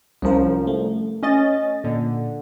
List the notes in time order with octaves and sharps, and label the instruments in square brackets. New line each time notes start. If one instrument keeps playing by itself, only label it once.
[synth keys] C2 F3 [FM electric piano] C#4 A#4
[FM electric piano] A3
[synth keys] C#4 D#5 A6
[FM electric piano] A#2 [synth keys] D3